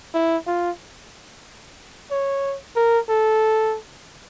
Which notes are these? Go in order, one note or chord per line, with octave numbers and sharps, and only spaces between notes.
E4
F4
C#5
A#4
A4